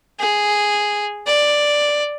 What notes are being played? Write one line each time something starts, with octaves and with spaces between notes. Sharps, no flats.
G#4
D5